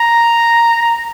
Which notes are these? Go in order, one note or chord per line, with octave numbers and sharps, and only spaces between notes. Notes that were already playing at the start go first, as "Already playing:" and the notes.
Already playing: A#5